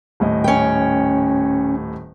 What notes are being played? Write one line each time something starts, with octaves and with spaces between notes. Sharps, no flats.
D#1 A2 D#5
C#4 G5